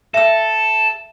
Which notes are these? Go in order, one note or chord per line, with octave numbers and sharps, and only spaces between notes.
A4 E5 E6